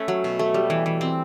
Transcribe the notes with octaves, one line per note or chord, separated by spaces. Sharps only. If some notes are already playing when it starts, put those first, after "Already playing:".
Already playing: A3 C#4 B4
F#3
B2
A3
G3
E3
E3
C4